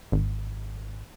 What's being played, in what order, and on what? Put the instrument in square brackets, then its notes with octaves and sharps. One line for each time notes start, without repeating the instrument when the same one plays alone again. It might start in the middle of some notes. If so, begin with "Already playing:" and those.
[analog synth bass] G#1